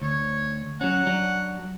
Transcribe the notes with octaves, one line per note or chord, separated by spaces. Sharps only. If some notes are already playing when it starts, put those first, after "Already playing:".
D2 C#5
F#3 C#4 F#5
F#3 D4